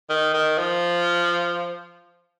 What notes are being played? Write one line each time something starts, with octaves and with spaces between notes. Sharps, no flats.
D#3
D#3
F3